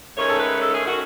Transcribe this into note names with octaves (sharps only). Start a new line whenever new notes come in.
G#2 D#3 A3 C#4 C#5
A4
B4
A4
G#4
D#3 A3 C#4 F#4